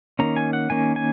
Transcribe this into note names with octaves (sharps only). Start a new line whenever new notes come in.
D#3 A#3 C#4 A#5
G#5
F#5
D#3 A#3 C#4 G#5
G#5